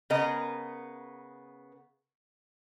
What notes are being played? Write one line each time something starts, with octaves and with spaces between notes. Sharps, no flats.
C#3 B3 A#4 D#5